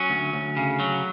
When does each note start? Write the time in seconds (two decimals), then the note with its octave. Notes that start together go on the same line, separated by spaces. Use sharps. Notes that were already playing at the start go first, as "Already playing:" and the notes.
Already playing: F#3 C#4
0.10 D2
0.33 D2
0.57 C#3
0.80 F#3